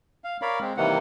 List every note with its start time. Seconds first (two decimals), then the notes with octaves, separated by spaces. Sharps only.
0.24 F5
0.42 A#4 C#5 D5 F5 B5
0.61 G#3 C4
0.77 C3 D#3 E3 G3 A#3 F#5